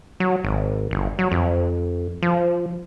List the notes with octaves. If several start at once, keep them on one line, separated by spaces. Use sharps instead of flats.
F#3
G#1
G1
F#3
F2
F3